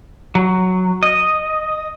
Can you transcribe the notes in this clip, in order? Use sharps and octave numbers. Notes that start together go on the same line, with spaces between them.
F#3
D#5